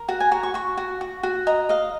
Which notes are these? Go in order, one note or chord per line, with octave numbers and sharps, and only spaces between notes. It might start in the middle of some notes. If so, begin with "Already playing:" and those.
Already playing: A#4
F#4 F#5
G#5
F#4 A#5
C#6
F#4 C#6
F#4
F#4
F#4
D#5 A#5
D#5 F5